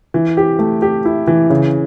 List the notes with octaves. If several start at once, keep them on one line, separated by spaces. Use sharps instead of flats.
E3
G4
A3
G4
E4
E3
C#3